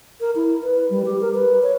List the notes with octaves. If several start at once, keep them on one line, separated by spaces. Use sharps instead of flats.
A#4
E4
B4
G3
G4
A#4
B4
C#5